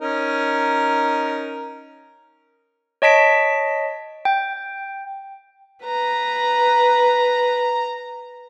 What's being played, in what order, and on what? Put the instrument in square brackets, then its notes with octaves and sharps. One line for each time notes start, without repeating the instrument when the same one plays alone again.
[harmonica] C#4 D#4 A#4
[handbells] C#5 D#5 A5 B6 D7
G5
[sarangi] B4 [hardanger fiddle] A#5